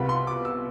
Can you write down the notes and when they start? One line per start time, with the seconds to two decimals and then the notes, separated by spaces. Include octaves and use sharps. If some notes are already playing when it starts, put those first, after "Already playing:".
Already playing: C2 B2 B3 F4 B5
0.09 C6
0.27 D6
0.45 E6